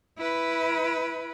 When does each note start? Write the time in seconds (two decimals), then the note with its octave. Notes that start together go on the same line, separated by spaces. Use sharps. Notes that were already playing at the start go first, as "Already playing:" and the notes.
0.18 E4 B4